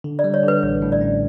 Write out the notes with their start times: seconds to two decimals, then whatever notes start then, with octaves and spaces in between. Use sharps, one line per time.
0.04 D3
0.19 D5
0.24 G3
0.34 C#5
0.43 D3 B4
0.63 A1 C#5
0.82 A2
0.92 D5
1.01 C#4